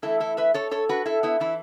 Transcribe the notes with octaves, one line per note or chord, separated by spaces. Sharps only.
E2 E3 A3 E4 A4
E4 A4
B4 E5
A4 C#5
A4 C#5
F#4 B4
E4 A4
B3 E4
E3 B3 E4